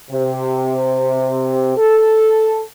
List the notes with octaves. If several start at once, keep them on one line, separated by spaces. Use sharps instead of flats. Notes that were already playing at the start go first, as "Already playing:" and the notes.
C3
A4